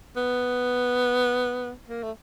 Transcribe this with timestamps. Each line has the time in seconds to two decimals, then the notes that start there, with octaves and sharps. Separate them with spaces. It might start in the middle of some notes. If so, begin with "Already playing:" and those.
0.16 B3
1.88 A#3
2.03 A3